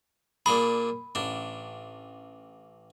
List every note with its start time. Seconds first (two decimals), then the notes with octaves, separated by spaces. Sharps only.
0.46 A#2 D4 G#4 B5
1.15 A1 D4